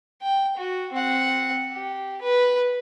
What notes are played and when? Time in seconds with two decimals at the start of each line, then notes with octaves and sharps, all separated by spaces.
0.22 G5
0.57 F#4
0.92 C4 F#5
1.73 G4
2.21 B4